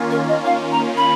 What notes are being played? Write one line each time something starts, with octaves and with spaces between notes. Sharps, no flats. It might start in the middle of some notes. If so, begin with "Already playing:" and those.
Already playing: D#3 A#3 C#4 F4
A#4
D#5
F5
A#5
B5